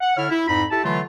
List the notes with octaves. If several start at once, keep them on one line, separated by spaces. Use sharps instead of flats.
F#5
D3 E4 C#5 F6
E4
F2 G#2 D#4 B5
E4 G4 A4 A5
D3 E3 F#3 A3 F4